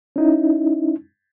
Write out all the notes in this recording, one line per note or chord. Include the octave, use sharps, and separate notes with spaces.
C#4 D#4 E4